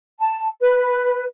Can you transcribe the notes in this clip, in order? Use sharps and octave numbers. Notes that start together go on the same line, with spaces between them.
A5
B4